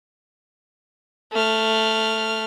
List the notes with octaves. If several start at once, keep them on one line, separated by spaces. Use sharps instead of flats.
A3 F6